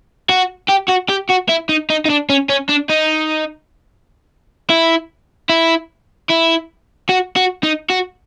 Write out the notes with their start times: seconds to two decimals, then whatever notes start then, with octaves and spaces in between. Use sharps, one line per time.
0.29 F#4
0.69 G4
0.89 F#4
1.10 G4
1.30 F#4
1.49 E4
1.69 D#4
1.90 D#4
2.05 D#4
2.10 D4
2.30 C#4
2.50 C#4
2.69 D4
2.90 D#4
4.70 E4
5.49 E4
6.30 E4
7.09 F#4
7.36 F#4
7.63 D#4
7.90 F#4